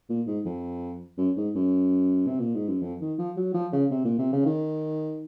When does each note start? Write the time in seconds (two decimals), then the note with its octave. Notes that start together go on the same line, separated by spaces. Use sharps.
0.09 A#2
0.27 G#2
0.45 F2
1.18 F#2
1.37 G#2
1.55 F#2
2.27 C3
2.40 A#2
2.55 G#2
2.69 F#2
2.82 F2
3.01 D#3
3.18 F3
3.37 F#3
3.54 F3
3.73 C#3
3.91 C3
4.05 A#2
4.18 C3
4.32 C#3
4.46 D#3